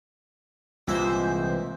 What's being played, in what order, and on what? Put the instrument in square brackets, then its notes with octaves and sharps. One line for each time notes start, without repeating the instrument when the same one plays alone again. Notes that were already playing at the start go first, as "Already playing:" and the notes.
[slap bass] C2 [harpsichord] A#2 E5 [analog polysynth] E3 G#3 C5